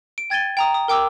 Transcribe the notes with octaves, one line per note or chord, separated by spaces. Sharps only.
D7
G5 G#6 A6 D#7 G7
G5 A#5 D#6
D#6
A#4 G5 D6 E6